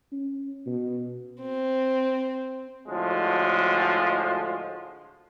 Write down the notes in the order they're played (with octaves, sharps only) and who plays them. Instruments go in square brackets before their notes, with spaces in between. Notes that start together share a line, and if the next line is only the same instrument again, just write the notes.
[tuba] C#4
B2
[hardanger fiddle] C4
[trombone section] A2 D3 F3 G#3 F#4